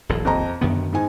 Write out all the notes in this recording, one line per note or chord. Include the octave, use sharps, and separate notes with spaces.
D#1 A#1 A2
F2 D#5 A#5
G1 F#2 D#3 B3
G#2 D#4 G#5